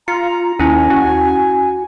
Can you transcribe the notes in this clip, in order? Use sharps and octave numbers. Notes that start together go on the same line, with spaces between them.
F4 A#5 C#7
D#2 C#4 E4 G#5
F#4